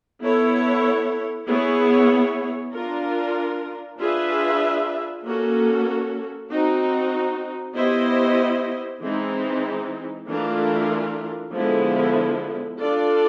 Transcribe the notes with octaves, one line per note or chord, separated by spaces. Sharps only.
B3 E4 A4 C#5
B3 E4 G#4 C#5
D4 F4 A#4
D4 F4 G#4 B4 E5
A#3 C#4 F#4 A4
C4 D#4 F#4
B3 E4 G4 C5 D#5
E3 G#3 C4 D#4
E3 A3 D4 F4 A#4
D3 F3 G#3 B3 E4
D4 F4 A4 D5